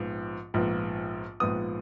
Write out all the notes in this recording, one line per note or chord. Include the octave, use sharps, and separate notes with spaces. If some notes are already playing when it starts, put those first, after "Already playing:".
Already playing: A#1 G#2 F3 B3
A#1 G#2 F3 B3
A#1 G#2 F3 B3 D#6